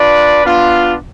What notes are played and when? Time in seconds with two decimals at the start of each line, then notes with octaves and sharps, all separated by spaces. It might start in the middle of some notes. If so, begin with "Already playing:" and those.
Already playing: D4 F4 B4 D5
0.43 B3 D4 F4